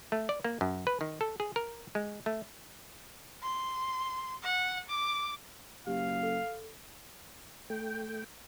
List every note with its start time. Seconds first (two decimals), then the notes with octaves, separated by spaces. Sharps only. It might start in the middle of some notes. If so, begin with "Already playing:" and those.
0.12 A3
0.29 D5
0.44 A#3
0.61 F#2
0.87 B4
1.01 D#3
1.21 A4
1.40 G#4
1.56 A#4
1.95 G#3
2.26 A3
3.42 C6
4.43 F#5
4.89 D6
5.87 F#1 G4 F5
6.23 A4
7.70 A3 G5